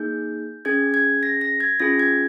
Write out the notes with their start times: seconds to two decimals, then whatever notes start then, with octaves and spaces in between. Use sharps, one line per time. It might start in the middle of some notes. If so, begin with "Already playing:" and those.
Already playing: A#3 D#4 G#4 G6
0.65 C#4 G#4 G#6
0.94 G#6
1.23 A#6
1.41 A#6
1.60 G#6
1.80 C#4 F4 G#4 A#6
1.99 G#6